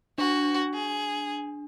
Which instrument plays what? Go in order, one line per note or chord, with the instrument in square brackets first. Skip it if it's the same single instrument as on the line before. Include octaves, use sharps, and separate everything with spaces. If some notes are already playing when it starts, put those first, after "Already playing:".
[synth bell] D4 [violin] F#4
[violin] G#4